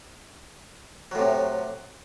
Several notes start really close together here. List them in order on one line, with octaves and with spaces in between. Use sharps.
F#3 A2 C3